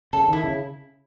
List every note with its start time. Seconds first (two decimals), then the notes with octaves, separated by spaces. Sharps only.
0.13 C#3 A4
0.28 D#3 E4
0.44 C#3